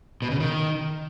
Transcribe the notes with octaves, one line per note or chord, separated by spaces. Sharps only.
B2
C#3
D#3